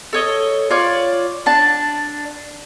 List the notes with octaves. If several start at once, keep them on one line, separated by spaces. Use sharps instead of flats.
A4 C#5 D#5
F4 C#5 D5
D4 A5